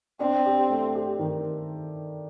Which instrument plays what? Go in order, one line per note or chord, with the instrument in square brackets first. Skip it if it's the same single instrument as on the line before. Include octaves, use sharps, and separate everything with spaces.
[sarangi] C4 [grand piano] D4
[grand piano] G4
A3
G4
D#3